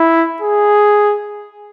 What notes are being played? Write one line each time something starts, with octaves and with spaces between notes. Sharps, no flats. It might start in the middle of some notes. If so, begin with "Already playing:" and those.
Already playing: E4
G#4